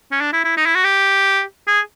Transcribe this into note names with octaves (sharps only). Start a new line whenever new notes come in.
C#4
D4
E4
E4
D#4
E4
F#4
G4
G#4